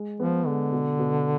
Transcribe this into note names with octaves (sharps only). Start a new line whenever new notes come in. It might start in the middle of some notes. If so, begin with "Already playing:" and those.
Already playing: G#3
F3 B3
D3 G#3
B2
B2